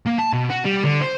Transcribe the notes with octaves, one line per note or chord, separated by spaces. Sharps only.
A#3
A5
B2
F#4
G3
D3
C5